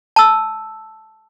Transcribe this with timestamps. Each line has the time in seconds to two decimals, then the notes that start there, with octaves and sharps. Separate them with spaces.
0.16 A5 E6